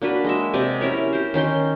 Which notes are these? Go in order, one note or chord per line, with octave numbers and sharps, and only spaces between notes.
A#3 D4 F#4 B4
G#3 D#5 E5
C3 D5 D#5 G#5
C#4 E4 A#4 C#5
G4 C5
D#3 C#4 G5 C6